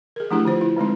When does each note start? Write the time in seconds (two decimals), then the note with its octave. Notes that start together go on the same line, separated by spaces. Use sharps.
0.16 G#4 A#4
0.31 F3 A3 D4 E4 G4 G#4
0.45 D3 F4 C5
0.61 E4
0.76 D3 G#3 C4 D#4